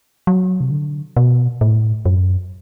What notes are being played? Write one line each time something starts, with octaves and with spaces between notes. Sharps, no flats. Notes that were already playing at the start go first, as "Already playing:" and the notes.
F#3
C3
D3
B2
A2
F#2